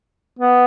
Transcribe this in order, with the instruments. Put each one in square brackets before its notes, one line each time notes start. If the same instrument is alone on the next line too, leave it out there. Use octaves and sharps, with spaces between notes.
[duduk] B3